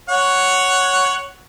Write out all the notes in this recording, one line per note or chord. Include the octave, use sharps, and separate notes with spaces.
C#5 F#5